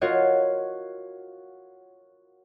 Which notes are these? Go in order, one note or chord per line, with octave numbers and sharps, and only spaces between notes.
F4 F#4 A#4 C#5 D#5